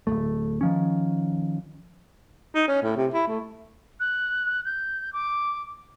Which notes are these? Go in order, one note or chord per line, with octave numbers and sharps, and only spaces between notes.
D1 E2 A3
D#3 F3 C#4
D#4
C#4
A2
C3
E4
A3
F#6
G6
D6